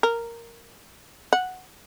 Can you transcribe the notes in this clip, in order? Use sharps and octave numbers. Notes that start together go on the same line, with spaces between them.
A#4
F#5